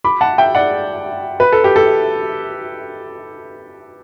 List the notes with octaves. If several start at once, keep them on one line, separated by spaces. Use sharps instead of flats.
B5 D6
F#5 A5
E5 G5
D5 F#5
B4
A4
G4
A4